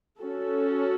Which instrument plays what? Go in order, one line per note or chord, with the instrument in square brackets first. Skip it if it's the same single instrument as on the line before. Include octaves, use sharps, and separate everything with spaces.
[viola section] C#4 F#4 A4